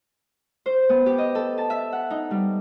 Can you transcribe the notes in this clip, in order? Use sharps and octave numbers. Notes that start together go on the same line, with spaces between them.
C5
B3
G4
D#5
A4
A5
E5
F#5
D#4
G3